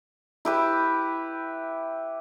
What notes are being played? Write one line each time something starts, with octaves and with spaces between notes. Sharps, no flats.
E4 G4 B4